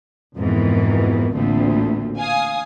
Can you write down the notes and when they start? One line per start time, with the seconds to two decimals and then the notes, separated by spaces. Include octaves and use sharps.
0.37 F2 G#2 B2 D#3 E3
1.32 A1 D2 A#2 A3 C4
2.18 F5 G#5 D#6